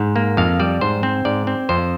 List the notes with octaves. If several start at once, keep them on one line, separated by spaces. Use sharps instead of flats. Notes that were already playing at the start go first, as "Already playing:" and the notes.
Already playing: G#2
A#3
F2 F5
G3 D5
G#2 C5
C4
G#2 D5
C4
F2 C5